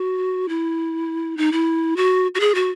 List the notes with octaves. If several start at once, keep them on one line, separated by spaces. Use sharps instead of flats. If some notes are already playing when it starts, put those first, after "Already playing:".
Already playing: F#4
E4
D#4
E4
F#4
F#4
G#4
F#4